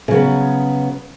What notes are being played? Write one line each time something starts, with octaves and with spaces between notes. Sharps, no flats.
C#3 F#3 B3